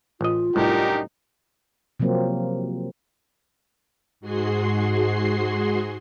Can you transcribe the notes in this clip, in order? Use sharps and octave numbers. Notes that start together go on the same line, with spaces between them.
A1 F4 D#5
C2 F#2 A2 D4 D#4 G4 A#4
C3 F3 F#3 A#3 C4
G#2 F#4 G#4 C6 C7